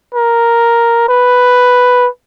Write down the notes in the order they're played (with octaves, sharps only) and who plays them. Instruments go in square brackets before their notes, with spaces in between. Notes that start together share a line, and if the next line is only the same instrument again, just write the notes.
[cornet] A#4
B4